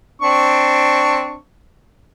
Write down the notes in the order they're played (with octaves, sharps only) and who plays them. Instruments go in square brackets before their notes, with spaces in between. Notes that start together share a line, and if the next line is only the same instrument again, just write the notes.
[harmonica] C4 D4 C#6